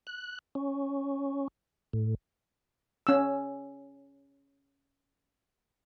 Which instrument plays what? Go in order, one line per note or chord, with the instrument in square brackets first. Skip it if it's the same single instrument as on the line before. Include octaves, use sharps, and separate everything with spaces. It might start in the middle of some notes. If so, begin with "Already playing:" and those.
[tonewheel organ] F#6
C#4
A2
[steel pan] C#4 E6